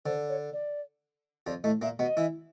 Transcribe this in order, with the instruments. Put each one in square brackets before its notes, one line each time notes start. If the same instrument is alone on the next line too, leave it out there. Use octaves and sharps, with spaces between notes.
[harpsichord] D3 [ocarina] C5
[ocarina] C#5
D5
[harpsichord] F2 F3 [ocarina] D5
[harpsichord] A2 A3 [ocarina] D#5
[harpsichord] A#2 A#3 [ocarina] E5
[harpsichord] B2 B3 [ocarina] D#5
[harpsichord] E3 E4